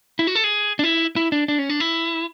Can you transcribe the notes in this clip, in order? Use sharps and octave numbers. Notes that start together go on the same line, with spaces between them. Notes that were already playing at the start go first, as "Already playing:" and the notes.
E4
F#4
A4
G#4
D4
E4
E4
D4
D4
C#4
D4
E4